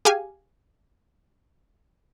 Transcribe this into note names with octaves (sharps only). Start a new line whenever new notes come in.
G4 G#4 F5 G#5